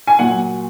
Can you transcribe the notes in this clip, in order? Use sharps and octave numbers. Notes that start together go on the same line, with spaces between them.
G#5
A#2 F#3 F#5